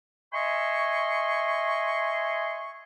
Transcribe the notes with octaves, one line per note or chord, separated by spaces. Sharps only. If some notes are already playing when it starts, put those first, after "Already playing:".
D#5 E5 G#5 C6 C#6